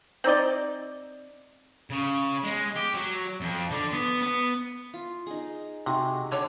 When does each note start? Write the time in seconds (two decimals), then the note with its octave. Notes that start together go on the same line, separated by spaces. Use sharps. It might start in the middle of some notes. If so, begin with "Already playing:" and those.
0.24 C4 D#4 D5 D#5
1.90 C#3
2.44 G#3
2.76 G4
2.94 F#3
3.41 F2
3.71 D3
3.93 B3
4.22 B3
4.94 F4
5.27 D#4 G#4
5.86 C3 D#4 F#4 G#4
6.32 D3 C#5